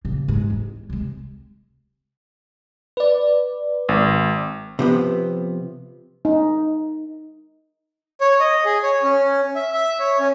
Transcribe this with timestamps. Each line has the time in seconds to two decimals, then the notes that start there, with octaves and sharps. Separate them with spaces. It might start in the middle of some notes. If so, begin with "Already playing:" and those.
0.05 A#2 C#3
0.28 G#2
0.50 E2
0.90 C3 G#3
2.97 B4 D5
3.89 G#1
4.79 C3 F3 B3
6.25 D#4
8.21 C#5
8.40 D#5
8.65 G#4
8.83 C#5
9.03 C#4
9.55 E5
9.73 E5
9.99 C#5
10.19 C#4